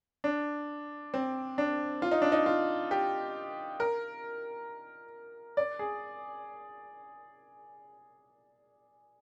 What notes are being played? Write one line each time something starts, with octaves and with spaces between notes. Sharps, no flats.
D4
C4
D4
F4
D#4
D4
D#4
F4
G4
A#4
D5
G#4